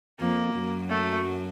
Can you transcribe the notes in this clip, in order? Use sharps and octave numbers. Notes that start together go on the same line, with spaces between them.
F2 F3 A#3
F#2 F#3
A3